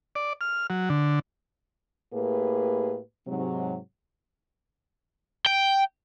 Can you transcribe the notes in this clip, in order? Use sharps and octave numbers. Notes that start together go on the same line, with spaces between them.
D5
F6
F#3
D3
A2 A#3 G4 G#4 B4
G#2 C3 F#3
G5